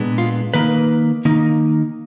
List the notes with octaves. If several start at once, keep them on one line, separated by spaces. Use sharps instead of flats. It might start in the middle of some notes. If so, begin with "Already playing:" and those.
Already playing: A#2 G#3 B3 D4
F4
D#3 A#3 D#4 B4
D#3 A#3 D#4